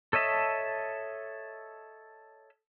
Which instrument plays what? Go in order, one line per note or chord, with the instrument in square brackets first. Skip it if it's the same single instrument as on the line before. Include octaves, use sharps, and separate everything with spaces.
[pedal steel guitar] A4 C#5 D#5 E5 A5